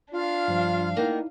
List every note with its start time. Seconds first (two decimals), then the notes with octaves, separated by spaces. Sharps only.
0.12 D4 F4 F5
0.48 G2 F3 G3
0.97 A#3 B3 D#4 E4 D#5 G5